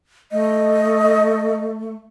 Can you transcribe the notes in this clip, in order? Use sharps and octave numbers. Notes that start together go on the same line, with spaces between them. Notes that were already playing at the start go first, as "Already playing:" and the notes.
A3 D#5